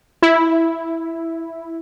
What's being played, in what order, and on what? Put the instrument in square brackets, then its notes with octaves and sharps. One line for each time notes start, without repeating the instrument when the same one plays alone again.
[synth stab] E4